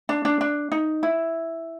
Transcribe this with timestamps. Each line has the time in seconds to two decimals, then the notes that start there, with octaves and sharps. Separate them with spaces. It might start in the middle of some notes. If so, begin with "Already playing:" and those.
0.09 D4
0.25 D4
0.41 D4
0.72 D#4
1.03 E4